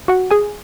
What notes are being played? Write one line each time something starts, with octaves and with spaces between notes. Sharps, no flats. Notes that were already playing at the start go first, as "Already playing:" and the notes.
F#4 F#5
G#4 G#5